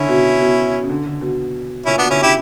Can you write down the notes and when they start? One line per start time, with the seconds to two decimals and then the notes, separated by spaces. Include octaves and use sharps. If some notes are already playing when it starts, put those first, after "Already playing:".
Already playing: D3 C#4 E4
0.09 B2
0.41 B2
0.82 C#3
0.89 D3
1.06 D3
1.21 B2
1.86 A#2 C#4 E4
1.98 B2 B3 D4
2.10 D3 C#4 E4
2.23 C#3 E4 G4